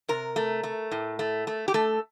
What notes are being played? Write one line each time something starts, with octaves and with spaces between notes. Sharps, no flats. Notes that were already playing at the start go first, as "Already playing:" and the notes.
C3 A#4
A3
A3
A2
A3
A3
G4
A3 A4